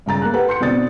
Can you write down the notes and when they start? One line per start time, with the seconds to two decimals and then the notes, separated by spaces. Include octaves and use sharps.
0.06 G2 C#3 A#5 A6
0.22 A#3 A#5 F#6
0.34 G4 A4 B4 F#5 A#5
0.49 C6 G6 C#7
0.60 B2 D3 C4 D5 D#6 A6